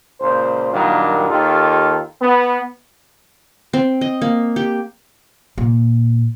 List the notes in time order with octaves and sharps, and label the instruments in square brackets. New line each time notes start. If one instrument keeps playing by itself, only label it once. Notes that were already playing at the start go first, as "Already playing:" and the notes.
[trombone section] C#2 A#2 C5
G2 A#2 D#3 F#3 A#3
D#2 D#3 F4 G4 A4
B3
[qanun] C4
D#5
A#3
G4
[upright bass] A#2